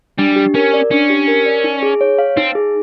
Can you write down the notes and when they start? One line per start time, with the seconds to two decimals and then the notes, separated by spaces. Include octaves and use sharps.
0.18 G3 D4
0.36 G4
0.54 C#4 A#4
0.73 D5
0.91 C#4 D4
1.10 G4
1.28 A#4
1.46 D5
1.64 D#4
1.83 G#4
2.01 C#5
2.19 F5
2.37 C4 D#4
2.55 G#4